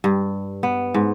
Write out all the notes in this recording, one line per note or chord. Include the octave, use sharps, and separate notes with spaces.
G2
B3
G#2